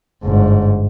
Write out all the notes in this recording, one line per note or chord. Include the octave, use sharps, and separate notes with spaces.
G1 G#2